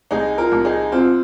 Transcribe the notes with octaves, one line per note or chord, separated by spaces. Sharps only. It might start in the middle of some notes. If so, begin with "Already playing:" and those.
C2 D#4 G#4
F4 A#4
C2
D#4 G#4
C3 C4 F4